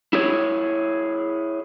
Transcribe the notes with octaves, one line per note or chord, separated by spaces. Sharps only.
E4 G#4 C#5